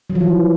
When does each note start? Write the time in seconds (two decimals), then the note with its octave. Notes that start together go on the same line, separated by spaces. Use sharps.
0.10 F#3
0.15 F3
0.21 E3